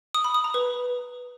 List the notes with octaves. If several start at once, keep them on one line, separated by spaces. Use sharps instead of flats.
D#6
B5
D#6
A#5
B4